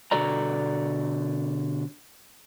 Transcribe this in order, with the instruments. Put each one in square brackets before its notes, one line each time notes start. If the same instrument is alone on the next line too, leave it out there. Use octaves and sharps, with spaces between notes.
[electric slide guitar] B2 D3 F#4 A4 D5 A#5